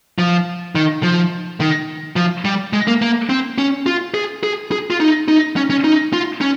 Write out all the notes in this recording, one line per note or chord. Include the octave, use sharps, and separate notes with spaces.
F3
D#3
F3
D#3
F3
G3
G#3
A#3
A#3
C4
C#4
F4
G#4
G#4
G#4
F4
D#4
D#4
C#4
C#4
D#4
F4
C#4